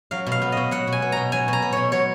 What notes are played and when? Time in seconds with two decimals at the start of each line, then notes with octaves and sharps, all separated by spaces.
0.11 F#3 F5
0.26 B2
0.32 F5
0.42 B3
0.52 B2 D#5
0.71 F#3 F#5
0.87 B2
0.92 G#5
1.02 B3
1.12 B2 A#5
1.32 F#3 G#5
1.48 B2 A#5
1.62 B3
1.72 B2 C#5
1.92 F#3 C#5